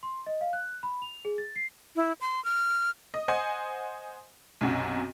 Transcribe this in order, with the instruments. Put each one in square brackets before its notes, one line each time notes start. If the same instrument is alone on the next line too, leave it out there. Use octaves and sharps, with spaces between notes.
[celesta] C6
D#5
F5
F#6
B5
F7
G#4
A6
C7
[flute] E4
C6
F6
[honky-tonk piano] D#5
C5 D#5 F#5 G#5
B1 F#2 C3 F#4